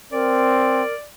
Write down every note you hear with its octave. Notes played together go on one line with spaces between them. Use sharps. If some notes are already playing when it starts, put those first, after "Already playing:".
C4 A#4 D5